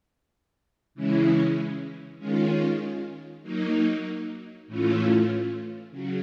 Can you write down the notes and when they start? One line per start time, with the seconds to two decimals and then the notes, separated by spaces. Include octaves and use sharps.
0.95 C#3 E3 G#3 C#4 E4
2.19 D#3 G#3 C#4 F4
3.43 F#3 A#3 D#4
4.67 A2 E3 A3 C#4 F4
5.91 C#3 F#3